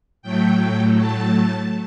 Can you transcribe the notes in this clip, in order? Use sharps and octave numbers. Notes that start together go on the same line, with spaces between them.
A2 F#3 A3 G5
A5